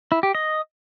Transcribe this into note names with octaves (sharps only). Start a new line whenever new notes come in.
E4
G4
D#5